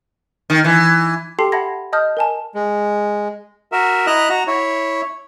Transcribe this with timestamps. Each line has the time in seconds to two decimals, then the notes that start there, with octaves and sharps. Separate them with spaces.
0.50 D#3
0.65 E3
1.39 G4 A4 G5 A5 C6 C7
1.52 E5 F#5 A5 B5 G#6 A#6
1.93 D#5 A5 D#6 F6 G6
2.17 A#4 G#5 A5
2.54 G#3
3.72 F#4 A#4 E5
4.07 E4 D#5 A#5 F#6
4.29 F#4 A#5
4.47 E4 C#5